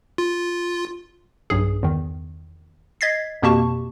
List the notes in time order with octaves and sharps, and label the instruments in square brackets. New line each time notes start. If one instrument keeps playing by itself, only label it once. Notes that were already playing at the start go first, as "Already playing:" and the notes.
[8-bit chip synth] F4
[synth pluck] B1 G2 G#4
E2 D#3
D#5 G#6 A6 B6 C7
F2 B2 A#3 G4 A5 C#6